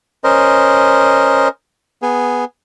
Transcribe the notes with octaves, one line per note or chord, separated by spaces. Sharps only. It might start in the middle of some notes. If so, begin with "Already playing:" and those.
C#4 A#4 C5 D#5
B3 G#4